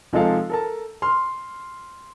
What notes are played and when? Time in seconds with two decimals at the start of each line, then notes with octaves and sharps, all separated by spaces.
0.13 C3 F3 G#3 D#4 A4 F5
0.50 A4 A#4 A5
1.02 C6 F6